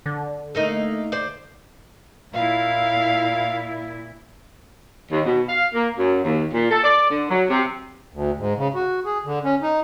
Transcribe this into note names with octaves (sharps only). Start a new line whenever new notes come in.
D3
A3 A#3 D#4
C5 D5
A#2 E4 F5
D#2
B2
F5
A#3
F#2
D#2
A#2
A4
D5
D3
F#3
C3
D2
G#2
C#3
F#4
G#4
D3
C#4
D#4